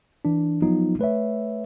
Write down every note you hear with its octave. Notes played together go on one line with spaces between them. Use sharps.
E3 D4
F3 F#3 B3 D#4 F4
A3 B4 C#5 E5